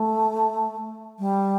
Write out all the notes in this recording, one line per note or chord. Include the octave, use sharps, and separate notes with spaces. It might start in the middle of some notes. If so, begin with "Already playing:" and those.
Already playing: A3
G3